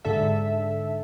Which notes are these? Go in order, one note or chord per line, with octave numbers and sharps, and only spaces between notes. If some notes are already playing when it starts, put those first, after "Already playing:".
G#2 D3 A4 E5